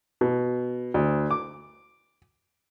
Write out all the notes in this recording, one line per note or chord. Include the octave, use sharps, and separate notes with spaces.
B2
D2
D6